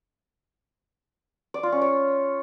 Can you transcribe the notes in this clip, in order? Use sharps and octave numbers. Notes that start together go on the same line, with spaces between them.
D5
F4
C#4
C#5